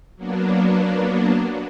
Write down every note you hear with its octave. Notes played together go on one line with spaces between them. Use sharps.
F#3 A#3 B3 D4